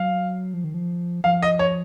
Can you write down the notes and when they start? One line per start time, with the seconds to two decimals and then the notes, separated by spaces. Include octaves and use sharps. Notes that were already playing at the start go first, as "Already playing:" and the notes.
Already playing: F#3 F5
0.54 F3
0.64 D#3
0.74 F3
1.24 F3 F5
1.42 D#5
1.59 C#5